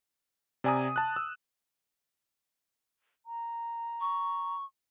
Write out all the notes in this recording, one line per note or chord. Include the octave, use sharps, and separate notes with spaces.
C3 D5 G#5 A#5 D#6
A5 F#6
E6
A#5
C#6